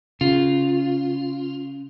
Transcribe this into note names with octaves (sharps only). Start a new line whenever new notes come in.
C#3 F4